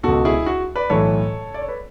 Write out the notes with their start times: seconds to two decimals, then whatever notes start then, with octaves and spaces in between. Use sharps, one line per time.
0.03 C#2 B2 F#4 A4
0.25 E4 G#4
0.46 F#4
0.76 B4 D5
0.90 B1 A2 E3 A4 C#5
1.54 D5
1.62 C#5
1.68 B4